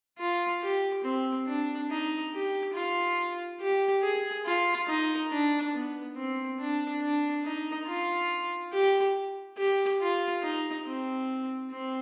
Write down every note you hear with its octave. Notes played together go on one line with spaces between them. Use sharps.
F4
G4
C4
D4
D#4
G4
F4
G4
G#4
F4
D#4
D4
B3
C4
D4
D4
D#4
F4
G4
G4
F4
D#4
C4
C4